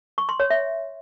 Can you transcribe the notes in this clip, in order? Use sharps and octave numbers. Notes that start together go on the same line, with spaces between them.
C#6
C6
C#5
E5